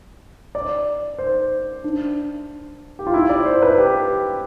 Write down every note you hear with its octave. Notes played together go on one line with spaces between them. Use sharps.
D5
C5
D4
G4
F4
E4
D5
C5
B4
G4